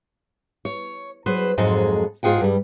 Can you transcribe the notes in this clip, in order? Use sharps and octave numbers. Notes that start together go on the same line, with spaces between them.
C#5
F#3 G#4 B4 C5
F2 G#2 F#3 G#3 G#4 A4
G#2 F4 G#4 F#5 G5
G2 G3